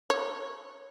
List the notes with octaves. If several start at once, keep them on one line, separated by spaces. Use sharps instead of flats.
C#5